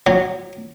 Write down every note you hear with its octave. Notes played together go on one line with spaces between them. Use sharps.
F#3